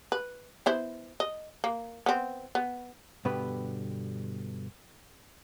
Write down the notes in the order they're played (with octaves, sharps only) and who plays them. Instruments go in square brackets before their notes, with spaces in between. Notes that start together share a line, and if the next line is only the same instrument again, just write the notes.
[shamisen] B4
B3 E4 C5
D#5
A#3
B3 C4
B3
[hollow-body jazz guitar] G2 B2 D3 B3 G4 B4